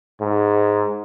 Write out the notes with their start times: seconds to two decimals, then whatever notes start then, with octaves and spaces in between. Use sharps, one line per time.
0.21 G#2